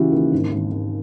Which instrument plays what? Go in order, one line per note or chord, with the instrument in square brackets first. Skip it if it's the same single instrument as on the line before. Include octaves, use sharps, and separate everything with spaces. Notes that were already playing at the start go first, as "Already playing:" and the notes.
Already playing: [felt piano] C#3 E3 E4 F#4 G4
D#2
G#1
G#1
G#1